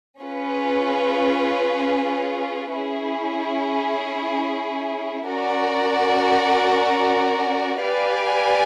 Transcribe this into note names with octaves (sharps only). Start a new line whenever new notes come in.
C#4 F4 G#4 B4
C#4 E4 G#4
C#4 F#4 A#4 D5
G4 B4 D5 F5 G#5